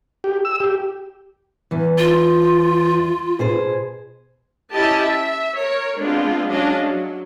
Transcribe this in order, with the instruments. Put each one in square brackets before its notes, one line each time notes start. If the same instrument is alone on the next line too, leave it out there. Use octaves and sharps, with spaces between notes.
[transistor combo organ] G4
E6
G4
[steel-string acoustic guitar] E2 E3
[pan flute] F4
[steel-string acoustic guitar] B2 G#4 C5
[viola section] C#4 E4 G4 D#5 A5
E5
A#4 C#5
G#3 B3 C4 D4 F4
F#3 G#3 C#4 D4 D#5 F5
F#3